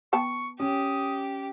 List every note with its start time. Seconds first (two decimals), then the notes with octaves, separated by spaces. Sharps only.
0.13 B3 G5 A5 C#6
0.60 C#4 G4 D#6